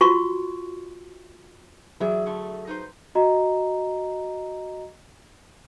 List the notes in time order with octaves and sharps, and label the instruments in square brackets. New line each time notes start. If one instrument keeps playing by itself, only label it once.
[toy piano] F4 F#4 C6 C#6
[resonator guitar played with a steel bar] E3 D5 E5 [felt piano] F#3 G#4
[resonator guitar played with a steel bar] D3 A3
D#4 B4 C5
[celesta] F#4 D#5 A#5